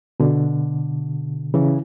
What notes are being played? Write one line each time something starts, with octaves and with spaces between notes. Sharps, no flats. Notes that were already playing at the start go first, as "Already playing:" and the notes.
B2 D3
C#3 E3